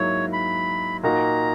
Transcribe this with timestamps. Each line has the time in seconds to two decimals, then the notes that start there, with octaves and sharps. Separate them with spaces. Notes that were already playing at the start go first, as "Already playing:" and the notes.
Already playing: G#2 F#3 A#3 E4 C#5
0.33 B5
1.03 A#2 A#3 D#4 F#4 A#5